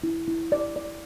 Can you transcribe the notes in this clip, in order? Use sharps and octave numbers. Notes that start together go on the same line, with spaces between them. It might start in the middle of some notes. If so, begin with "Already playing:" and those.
E4
E4
D5
D5